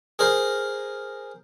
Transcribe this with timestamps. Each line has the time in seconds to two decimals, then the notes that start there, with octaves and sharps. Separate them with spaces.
0.19 G#4 A#4 C5